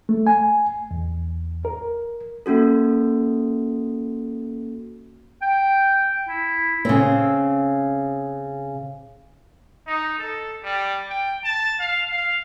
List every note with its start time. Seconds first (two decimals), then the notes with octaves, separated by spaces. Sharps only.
0.09 A3
0.27 G#5
0.91 E2
1.65 A#4
2.46 A#3 C#4 F#4 A4
5.42 G5
6.29 E4
6.85 C#3 C4
9.87 D#4
10.19 A4
10.63 G3
11.10 G5
11.44 A5
11.80 F5
12.12 F5